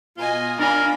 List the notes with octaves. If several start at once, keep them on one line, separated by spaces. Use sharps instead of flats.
B2 F4 D#5 G#5
D4 A#4 D5 F5 G#5 B5